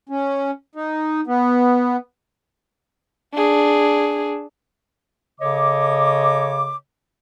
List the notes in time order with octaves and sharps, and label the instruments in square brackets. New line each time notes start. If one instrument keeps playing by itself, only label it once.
[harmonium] C#4
D#4
B3
[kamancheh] D4 G#4
[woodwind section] C#3 A4 C#5 D#5 D6